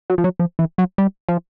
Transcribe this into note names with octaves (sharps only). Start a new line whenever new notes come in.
F#3
F3
F#3
F3
E3
F#3
G3
F3